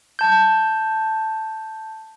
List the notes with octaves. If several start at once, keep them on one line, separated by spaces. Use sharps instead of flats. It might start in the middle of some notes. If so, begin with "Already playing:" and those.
A5 G6